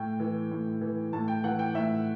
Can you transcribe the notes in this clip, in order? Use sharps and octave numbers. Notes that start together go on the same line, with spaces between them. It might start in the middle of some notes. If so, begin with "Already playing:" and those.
Already playing: A2 G5
E3
A2
E3
A2 A5
G5
E3 F#5
G5
A2 E5